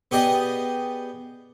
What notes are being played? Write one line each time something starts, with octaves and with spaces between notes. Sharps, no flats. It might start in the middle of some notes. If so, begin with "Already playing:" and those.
B3 G4 G#4 D5 D#5